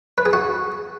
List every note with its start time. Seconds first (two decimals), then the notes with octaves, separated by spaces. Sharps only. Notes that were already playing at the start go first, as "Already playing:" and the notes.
0.18 B4
0.26 G#4
0.33 F#4